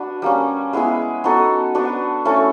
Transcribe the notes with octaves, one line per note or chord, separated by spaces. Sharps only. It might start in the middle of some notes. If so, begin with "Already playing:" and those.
Already playing: D4 F#4 B4
G3 A#3 C#4
G#3 B3 E4 G#4
B3 D#4 F#4 A4
B3 D4 F#4 B4
A3 C#4 E4 A4